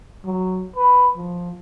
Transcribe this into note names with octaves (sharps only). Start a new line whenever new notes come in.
F#3
B4
F3